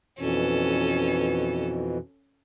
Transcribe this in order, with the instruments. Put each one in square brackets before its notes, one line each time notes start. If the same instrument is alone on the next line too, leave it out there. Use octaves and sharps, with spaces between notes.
[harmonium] F2 B2 E3 [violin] C#4 A4